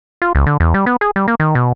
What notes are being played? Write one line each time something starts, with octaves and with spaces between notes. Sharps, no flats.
F4
C#2
D3
E2
G3
B3
G#4
G3
A#3
D#3
B2